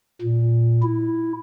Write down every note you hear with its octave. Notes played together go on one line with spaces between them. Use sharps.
A#2
E4